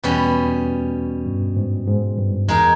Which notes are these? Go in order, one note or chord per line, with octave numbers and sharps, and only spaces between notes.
E2 B2 G3 C#4
G2
G#2
G#2
G2
E2 G#3 D#4 A#4